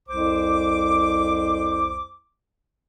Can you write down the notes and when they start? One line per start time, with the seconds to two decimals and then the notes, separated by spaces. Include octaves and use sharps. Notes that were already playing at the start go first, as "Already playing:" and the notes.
0.07 C2 F2 C5 D6